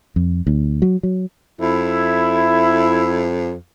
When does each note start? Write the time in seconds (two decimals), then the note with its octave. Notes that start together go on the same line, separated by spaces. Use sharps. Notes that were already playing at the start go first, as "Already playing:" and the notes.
0.16 F2
0.47 D2
0.82 F#3
1.03 F#3
1.61 F2 E4